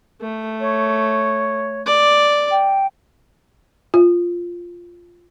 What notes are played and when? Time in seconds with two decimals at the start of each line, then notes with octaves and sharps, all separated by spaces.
0.21 A3
0.60 C#5
1.86 D5
2.51 G5
3.94 F4